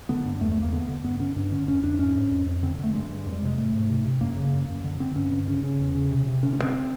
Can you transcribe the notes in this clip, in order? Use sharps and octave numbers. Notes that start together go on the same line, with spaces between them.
D3 B3
G2
E2 A3
A3
E2
A#3
D3 B3
D3
G2 B3
D3 C#4
G2 D4
D3 C#4
F2 C#4
F2 D4
G#2 C#4
G#2
F2
F2
D3 C4
D3
A3
G2 G#3
G2
F2
G3
C3 G#3
G#2 A3
G#2
C3
C3
F#2 A#3
C#3
F#2
F#2
D3
D3 C4
G2 C#4
D3
C#3 C#4
C#3 C#4
E2
C#3
C3
C3
D3 C#4
C#4
G2
C4